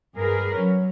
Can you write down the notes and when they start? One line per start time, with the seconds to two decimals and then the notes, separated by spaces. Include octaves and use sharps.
0.15 G2 G#4 A#4 B4
0.56 F#3 C#4